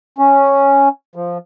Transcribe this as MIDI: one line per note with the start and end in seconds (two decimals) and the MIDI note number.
0.18 0.89 61
1.16 1.38 53